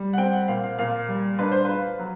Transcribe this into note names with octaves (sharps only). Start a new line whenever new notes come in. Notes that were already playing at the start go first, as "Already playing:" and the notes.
Already playing: G3
F#5
C4 G5
F#5
A#2 F5
F5
A#2 F5
G3
D4 B4
C5
F4 B4
F#3